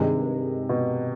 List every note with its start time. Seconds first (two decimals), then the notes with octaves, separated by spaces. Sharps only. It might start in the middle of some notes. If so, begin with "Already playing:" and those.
Already playing: G2 C3 D#3 G#3
0.69 B2